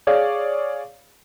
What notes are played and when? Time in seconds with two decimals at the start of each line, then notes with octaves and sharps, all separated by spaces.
0.07 G#4 C#5 D5 F5